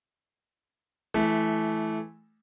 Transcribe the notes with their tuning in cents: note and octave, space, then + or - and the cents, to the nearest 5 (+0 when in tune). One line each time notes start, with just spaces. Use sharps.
E3 +0 A3 -20